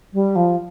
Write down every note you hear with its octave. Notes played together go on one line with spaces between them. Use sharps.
G3
F3